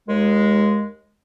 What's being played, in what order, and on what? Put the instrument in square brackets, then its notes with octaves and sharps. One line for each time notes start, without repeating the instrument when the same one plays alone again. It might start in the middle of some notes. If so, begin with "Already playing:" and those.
[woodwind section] D#2 G#3